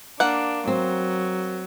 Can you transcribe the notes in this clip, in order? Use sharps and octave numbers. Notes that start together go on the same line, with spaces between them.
A#3 D4 F#5
F#3 C4